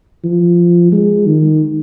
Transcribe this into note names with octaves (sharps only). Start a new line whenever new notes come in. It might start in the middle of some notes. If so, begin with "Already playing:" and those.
F3
G#3
D#3